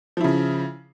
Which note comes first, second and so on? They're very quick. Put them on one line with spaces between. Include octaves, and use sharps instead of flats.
F3 E4 C#3